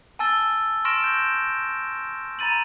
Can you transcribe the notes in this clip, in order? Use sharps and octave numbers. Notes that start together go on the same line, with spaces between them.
G#5 A5 E6 A6 G7
C6 C#6 F6 A#6 D7 E7
G6
A#5 B5 A6 D#7 F#7